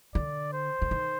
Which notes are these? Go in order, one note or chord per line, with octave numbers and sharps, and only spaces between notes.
D3 D5
C5
D3
D#3